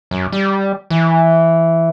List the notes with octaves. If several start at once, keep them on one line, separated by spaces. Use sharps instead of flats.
F#2
G3
E3